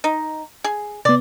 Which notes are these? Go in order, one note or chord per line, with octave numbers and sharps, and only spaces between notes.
D#4
G#4
C3 B3 D5